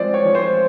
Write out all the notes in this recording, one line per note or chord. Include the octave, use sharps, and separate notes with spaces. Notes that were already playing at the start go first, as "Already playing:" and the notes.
Already playing: F3 G#3 C4 C5 D5
C#5
F3
C5